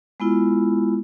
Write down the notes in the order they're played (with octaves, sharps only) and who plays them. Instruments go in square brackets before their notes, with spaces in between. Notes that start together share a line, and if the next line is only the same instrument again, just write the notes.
[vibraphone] G#3 B3 E4 F4